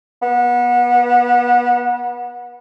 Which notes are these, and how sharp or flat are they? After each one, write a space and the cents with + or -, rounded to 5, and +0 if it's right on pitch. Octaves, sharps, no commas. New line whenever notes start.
B3 -30